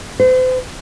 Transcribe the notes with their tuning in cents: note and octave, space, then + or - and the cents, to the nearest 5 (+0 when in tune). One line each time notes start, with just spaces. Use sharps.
C5 -40